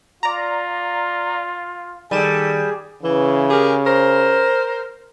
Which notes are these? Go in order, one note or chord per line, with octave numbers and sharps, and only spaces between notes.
F4 D5 A#5
D#3 G3 G#4 A4 D#7 E7
C#3 E3
G4 G#4 A#4
A#4 C5